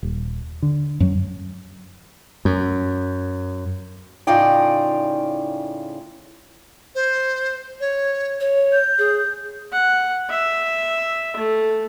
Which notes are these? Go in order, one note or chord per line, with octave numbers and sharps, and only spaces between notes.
D#1
D3
F#2 F#3
F#2
A2 C#3 D#4 F4 D5 G5
C5
C#5
C#5
G6
G#4
F#5
E5
A3